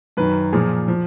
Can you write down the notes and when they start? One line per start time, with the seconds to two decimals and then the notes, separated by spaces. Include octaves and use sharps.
0.17 F#2 D#3 B4
0.53 A#2 F3 G#4
0.88 F3